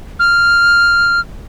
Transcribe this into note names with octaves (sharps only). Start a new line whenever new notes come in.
F6